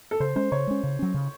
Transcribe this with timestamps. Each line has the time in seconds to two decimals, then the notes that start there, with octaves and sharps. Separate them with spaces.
0.11 A4
0.20 C#3 C5
0.36 G#3 C#4 C5
0.52 C#3 C#5
0.67 G#3 C#4
0.83 C#3
0.99 F#3 C#4
1.14 C#3